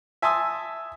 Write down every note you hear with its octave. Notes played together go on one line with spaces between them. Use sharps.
E5 G#5 A5 C6 D#6 E6